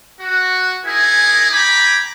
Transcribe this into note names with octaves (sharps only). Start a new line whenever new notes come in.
F#4
D#4 E4 G#4 A#4 G#5
G5 G#5 A#5 B5 D6